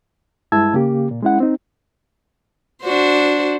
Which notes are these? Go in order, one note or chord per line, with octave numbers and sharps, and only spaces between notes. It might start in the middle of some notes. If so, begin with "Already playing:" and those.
G2 G#3 E4 A5 E6 G#6
C#3 A#3 G4
A#2
G#3 C#4 E4 F#5
C4 D#4
D4 F#4 C5